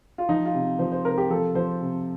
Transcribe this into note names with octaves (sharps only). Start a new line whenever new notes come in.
F4
F3 D#4
F4
C3
F3 C5
C5
C3 A#4
G4
F3 A4
F3 C5
C3